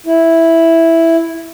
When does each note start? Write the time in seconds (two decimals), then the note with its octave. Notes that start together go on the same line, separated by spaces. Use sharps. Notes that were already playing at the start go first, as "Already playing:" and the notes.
0.06 E4